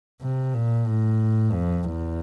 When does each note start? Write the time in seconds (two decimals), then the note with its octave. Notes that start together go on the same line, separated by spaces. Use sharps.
0.21 C3
0.54 A#2
0.86 A2
1.52 F2
1.84 E2